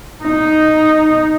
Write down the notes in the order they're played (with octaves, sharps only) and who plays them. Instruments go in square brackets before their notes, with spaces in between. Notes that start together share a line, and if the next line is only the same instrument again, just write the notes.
[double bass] D#4